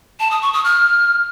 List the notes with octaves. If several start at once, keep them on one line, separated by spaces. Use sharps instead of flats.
A5
D#6
C#6
D#6
F6